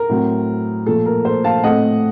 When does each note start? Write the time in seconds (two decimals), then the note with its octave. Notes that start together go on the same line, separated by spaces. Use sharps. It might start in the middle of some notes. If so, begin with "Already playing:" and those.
Already playing: A#4
0.09 A2 F#3 C4
0.86 A#2 F3 A3 A4
1.06 A#4
1.25 A4 C5
1.44 F5 A5
1.63 A2 A3 C4 D#5 F#5